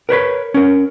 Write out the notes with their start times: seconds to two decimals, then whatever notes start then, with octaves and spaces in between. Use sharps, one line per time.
0.09 A#4 B4 C#5 B5
0.54 C#4 A#4